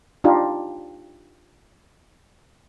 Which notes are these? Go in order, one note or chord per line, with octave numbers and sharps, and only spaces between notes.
D4 D#4 F4 G4